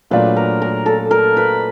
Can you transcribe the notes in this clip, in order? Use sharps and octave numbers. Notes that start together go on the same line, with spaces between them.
A#2 F#3 A3 D4 F4 B4
A#4
A#4
A4
A#4
B4